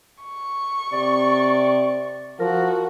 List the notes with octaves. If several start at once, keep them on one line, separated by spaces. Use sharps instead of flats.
C#6
C3 D5
F3 F#4 A#4